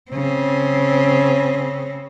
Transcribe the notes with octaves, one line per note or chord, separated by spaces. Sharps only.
C#3 C4